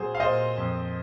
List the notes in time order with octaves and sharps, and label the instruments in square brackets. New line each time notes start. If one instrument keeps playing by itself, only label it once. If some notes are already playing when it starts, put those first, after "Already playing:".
Already playing: [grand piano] A#2 F#3 C4 G#4 C5
F5
A#2 C5 D#5
F2